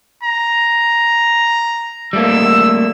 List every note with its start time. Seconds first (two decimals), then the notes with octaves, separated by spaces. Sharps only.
0.23 A#5
2.13 G3 A3 A#3 E6